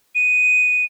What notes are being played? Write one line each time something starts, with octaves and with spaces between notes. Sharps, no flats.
D#7